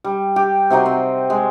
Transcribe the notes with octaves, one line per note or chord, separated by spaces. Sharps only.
G3
G4
C3 F#3 D#4 C6
C4
G#3